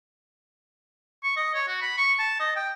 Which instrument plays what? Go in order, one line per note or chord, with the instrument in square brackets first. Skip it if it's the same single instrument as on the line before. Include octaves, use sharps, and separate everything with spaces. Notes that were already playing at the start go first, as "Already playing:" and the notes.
[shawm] C#6
D#5
C#5
F#4
B5
C#6
A5
D#5
G5